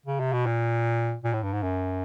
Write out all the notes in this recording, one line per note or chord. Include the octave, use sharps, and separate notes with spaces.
C#3
C3
B2
A#2
A#2
A2
G2
G#2
F#2